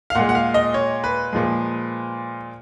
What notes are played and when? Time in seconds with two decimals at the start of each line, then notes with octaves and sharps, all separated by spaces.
0.10 F5
0.15 A#2 G#3 F#5
0.29 F#5
0.35 F5
0.54 D#5
0.74 C#5
1.04 B4
1.33 A#2 F3 G#3